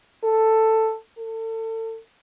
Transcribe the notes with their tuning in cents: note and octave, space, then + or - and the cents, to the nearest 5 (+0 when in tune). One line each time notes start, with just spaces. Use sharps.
A4 +10
A4 +35